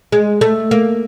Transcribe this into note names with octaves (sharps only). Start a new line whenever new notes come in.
G#3
A3
A#3